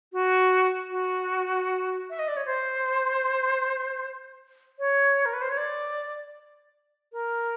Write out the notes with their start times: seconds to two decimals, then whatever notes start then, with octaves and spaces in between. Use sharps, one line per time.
0.13 F#4
0.90 F#4
2.10 E5
2.19 D#5
2.28 D5
2.37 C#5
2.46 C5
4.79 C#5
5.26 A#4
5.33 B4
5.42 C5
5.49 C#5
5.57 D5
7.13 A#4